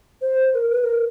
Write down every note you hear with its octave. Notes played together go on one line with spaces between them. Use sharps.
C5
A#4
B4
A#4